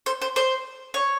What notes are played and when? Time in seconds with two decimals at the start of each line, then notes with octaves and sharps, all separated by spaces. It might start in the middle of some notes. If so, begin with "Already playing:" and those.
0.06 C5
0.21 C5
0.36 C5
0.94 C#5